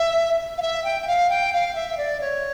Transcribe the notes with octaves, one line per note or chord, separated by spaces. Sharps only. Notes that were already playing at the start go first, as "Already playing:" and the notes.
Already playing: E5
F5
E5
G5
G5
F5
G5
F5
E5
D5
C#5